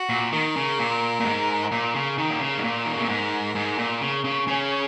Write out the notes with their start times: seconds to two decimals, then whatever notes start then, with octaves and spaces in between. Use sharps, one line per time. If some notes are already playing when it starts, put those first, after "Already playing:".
Already playing: F#4
0.09 A#2
0.32 D#3 A#4
0.56 C#3
0.79 A#2
1.20 A#2
1.25 G#2
1.72 A#2 A#4
1.94 C#3
2.17 D#3 A#4
2.30 A#2
2.41 C#3
2.58 G#2
2.64 A#2
2.86 D#3
2.94 C#3
3.02 A#2
3.09 G#2
3.55 G#2
3.78 A#2
4.01 C#3
4.24 C#3
4.47 C#3 C#4